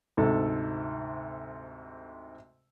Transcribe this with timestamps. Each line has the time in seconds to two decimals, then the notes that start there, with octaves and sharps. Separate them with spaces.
0.17 D2 G#2 C3 A4